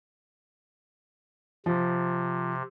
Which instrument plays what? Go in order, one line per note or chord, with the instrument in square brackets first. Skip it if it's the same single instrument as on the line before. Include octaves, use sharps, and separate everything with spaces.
[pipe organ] C3 [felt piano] F3